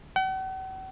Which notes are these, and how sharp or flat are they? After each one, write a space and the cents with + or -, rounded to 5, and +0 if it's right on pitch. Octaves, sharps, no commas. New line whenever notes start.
F#5 +45